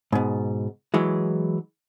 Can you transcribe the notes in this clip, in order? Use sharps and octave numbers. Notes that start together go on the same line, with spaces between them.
G#2 B2
E3 F#3 G#3